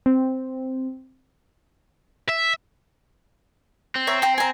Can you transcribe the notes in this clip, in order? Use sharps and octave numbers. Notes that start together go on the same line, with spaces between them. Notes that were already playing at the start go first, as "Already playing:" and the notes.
C4
E5
C4
C#5 E5 A#5
C5 G5 A#5
G#5 A#5